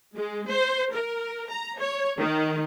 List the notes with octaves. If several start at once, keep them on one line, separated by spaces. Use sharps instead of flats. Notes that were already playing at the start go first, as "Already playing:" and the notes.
G#3
C5
A#4
A#5
C#5
D#3